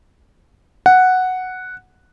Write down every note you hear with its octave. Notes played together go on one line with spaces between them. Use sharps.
F#5